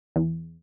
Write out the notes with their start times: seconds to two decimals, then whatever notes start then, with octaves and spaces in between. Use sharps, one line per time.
0.16 E2